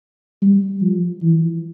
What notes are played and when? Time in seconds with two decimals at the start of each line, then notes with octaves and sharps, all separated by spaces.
0.42 G3
0.82 F3
1.22 E3